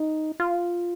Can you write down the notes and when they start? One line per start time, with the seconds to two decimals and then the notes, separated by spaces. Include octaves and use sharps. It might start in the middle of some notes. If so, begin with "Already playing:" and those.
Already playing: D#4
0.40 F4